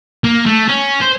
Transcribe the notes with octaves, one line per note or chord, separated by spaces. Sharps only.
A#3
A3
C#4
C5